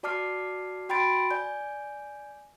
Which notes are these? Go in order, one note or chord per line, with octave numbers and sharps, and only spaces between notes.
F#4 D5 A5 D6 F6 C7
F#4 G5 B5 C6 A6 D7
D5 G#5 G6